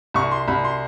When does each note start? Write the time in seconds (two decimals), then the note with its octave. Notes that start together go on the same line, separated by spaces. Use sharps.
0.14 C2 C#6
0.31 C6
0.48 C2 B5
0.64 C6